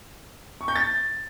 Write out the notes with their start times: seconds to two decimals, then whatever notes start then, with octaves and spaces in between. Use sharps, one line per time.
0.61 C#6
0.68 G6
0.76 A6